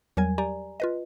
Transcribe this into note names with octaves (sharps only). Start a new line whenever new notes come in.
E2 F#3 G3 A#4 G#5 G#6
G4 D5 G#5 A#5
F4 B4 D#5